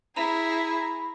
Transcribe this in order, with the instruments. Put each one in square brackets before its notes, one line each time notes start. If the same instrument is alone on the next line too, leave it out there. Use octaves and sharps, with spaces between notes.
[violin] E4 G#4 [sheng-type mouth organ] A#5 [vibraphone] B5